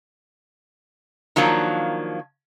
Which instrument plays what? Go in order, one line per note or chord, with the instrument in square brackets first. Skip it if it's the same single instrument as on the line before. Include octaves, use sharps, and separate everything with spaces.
[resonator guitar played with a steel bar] D#3 F3 F#3 A#3 D4